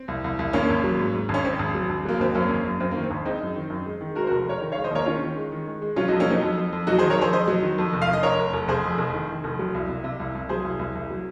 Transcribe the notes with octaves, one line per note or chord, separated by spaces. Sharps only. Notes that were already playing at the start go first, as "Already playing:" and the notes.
Already playing: C4
C2
C2
C2
G#1 A#3 C#4
G#1
F#3
G#2
G#2
G#1
C#4
G#2 C4
G#1
F#3
G#1
F#3 A#3
G#1 C4
F#2 A#3 C#4
G#1
F#2
F#2 C4
A#3
D#3
C4
G#1
G#3 C4 D#4
F#2
D#3
F#2
G#3
D#3
G#3 F#4 A#4
C5
F#4 A#4
F1
F1 A#4 C#5
D#3
C#5 F5
G#3
C5 D#5
D#2 A#4 C#5
D#3 C#4 F4
D#3
G#3
D#3
G#3
G#3
F#3 C#4 F4
D#4 F#4
F2
A#3 C#4
F#3 C4 D#4
F2
F2
F2
F#3 D#4 F#4
D#3 G#4 C5
A#4 C#5
F2 G#4 C5
F2 C5 D#5
F#3
D#3
F2
F1
F5
F1
D#5
F1 A#4 C#5
F1
F1
F1 G#4 C5
F2
F1
D#3
D#3
F1
F#3
C2
C3
C3
C2
C2
F#3 G#4 C5
C2
C2
C2
F#3